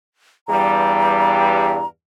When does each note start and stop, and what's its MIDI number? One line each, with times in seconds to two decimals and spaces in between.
0.48 1.80 40
0.48 1.80 43
0.48 1.80 55
0.48 1.86 82